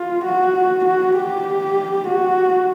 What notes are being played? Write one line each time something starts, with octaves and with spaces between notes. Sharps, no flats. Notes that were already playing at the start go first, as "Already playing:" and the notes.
Already playing: F4
F#4
F#4
G4
F#4